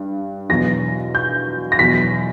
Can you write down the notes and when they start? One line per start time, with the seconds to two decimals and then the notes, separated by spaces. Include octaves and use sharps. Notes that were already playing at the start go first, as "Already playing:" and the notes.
Already playing: G2
0.49 E2 B2 F#3 A#6
1.15 G6
1.72 A#6
1.79 E2 B2 F#3 B6